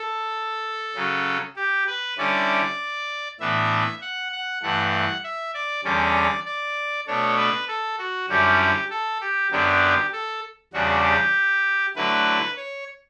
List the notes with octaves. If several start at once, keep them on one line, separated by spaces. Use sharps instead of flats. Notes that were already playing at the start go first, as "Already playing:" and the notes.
Already playing: A4
C#3 F#3 C#4
G4
B4
D3 G3 C#4 E4 D5
A2 E3 B3 D4 E5
F#5
F#5
G2 E3 A3 F#5
E5
D5
E2 D3 G3 C#4 D5
D5
B2 A3 D4 C#5
B4
A4
F#4
F#2 D3 G3 C#4 E4 G4
A4
G4
F#2 D3 F#3 B3 D4 G4
A4
E2 C#3 G3 D4 F#4
G4
D3 F#3 A3 E4 B4
C#5